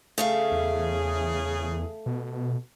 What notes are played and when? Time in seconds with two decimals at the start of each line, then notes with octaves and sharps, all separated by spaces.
0.18 C#3 A3 G#4 E5 F5
0.52 E2
2.06 B2